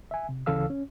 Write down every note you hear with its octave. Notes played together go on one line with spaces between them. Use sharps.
E5 G#5
C3
D2 C#3 E3 A4 F5 E6
C#4